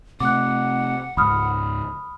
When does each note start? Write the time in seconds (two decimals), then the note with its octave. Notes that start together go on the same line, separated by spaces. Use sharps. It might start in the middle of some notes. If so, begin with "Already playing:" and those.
0.20 C3 A3 F#5 D6 F#6
1.17 C#2 G#2 B5 D#6 F6